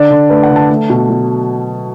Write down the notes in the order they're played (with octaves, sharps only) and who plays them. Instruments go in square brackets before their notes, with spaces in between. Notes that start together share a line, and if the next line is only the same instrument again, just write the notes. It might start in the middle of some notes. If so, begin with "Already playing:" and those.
Already playing: [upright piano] D3 D4 D5
D3
A3 B4
F#5
D3
A5
A3
B2
F#3